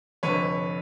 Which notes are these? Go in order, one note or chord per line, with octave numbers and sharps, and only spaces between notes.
F1 F2 D3 B4 C#5